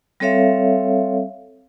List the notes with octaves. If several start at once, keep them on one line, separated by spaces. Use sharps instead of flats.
G3 C4 A4 C#5 E5 F5